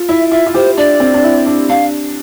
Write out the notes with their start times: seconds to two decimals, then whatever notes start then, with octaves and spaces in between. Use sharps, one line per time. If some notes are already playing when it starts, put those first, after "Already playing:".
Already playing: F4
0.08 E4 E5
0.31 F4 E5
0.47 F4
0.54 G4 C5
0.77 D4 D5
1.00 C4
1.14 D4
1.24 E4
1.47 D4
1.70 D4 F5